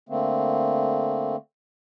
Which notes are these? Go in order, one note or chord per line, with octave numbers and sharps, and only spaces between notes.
D3 A3 A#3 C4